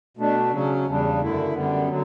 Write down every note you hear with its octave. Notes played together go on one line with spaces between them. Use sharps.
B2 A3 D4
C#3 F#3 C#4
E2 C#3 G3 D4
F#2 D3 A3 E4
F#2 D3 G3 B3
D3 F#3